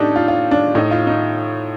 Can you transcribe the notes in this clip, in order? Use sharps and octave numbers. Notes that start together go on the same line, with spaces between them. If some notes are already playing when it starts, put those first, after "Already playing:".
Already playing: A2 D4 D#4 G4 A4
F4
F4
D4
A2 D#4
F4
D#4